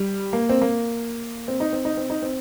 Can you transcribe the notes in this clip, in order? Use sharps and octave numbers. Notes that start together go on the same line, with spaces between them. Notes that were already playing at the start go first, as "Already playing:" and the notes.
Already playing: G3
A#3
C4
A#3
C4
D#4
C4
D#4
C4
D#4
C4